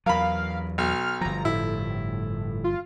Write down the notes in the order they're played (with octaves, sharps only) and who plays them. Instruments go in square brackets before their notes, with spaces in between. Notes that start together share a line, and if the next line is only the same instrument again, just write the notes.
[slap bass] E2 F#3 [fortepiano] A#4 B5 [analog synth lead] F5
[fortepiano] B1 [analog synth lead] F6
[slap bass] G1 F3 [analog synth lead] A#5
[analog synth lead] A2 [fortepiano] E4
[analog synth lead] F4